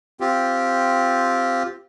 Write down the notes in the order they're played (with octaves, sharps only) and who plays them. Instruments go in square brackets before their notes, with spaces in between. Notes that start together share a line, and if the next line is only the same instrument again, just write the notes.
[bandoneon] C4 F4 G4